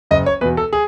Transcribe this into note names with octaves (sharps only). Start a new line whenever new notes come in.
F#1 D#5
C#5
E2 B2 B4
A4
G#4